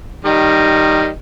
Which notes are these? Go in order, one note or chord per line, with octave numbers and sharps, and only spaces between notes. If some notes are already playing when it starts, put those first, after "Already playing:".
D#3 G3 D#5